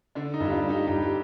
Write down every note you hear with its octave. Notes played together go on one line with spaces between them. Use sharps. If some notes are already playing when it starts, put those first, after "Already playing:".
D3 D4
D#4
G2 G4
D4 F4
G3
D#4 G4
G2 D#4 G4
G4